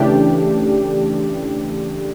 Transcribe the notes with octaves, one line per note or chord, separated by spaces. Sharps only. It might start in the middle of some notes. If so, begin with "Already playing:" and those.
Already playing: C#3 E3 A3 D4 G4